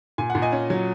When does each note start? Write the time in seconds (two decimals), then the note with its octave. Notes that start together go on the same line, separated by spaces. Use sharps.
0.18 A#2 G#5
0.30 F#5
0.35 A#2
0.42 D#5 G#5
0.52 C#4
0.70 F#3